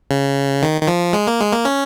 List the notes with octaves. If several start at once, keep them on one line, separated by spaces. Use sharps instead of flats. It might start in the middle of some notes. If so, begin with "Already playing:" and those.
C#3
D#3
D#3
F3
G#3
A#3
G#3
A#3
C#4